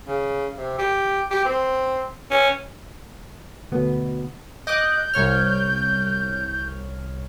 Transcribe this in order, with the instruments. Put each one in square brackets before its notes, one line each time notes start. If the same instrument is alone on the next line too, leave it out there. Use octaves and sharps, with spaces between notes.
[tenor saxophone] C#3
C3
G4
G4
C4
C#4
[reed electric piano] D2 B2 B3
[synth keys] D#5 D6 F#6 [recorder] G6
[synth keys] C2 C#5 F6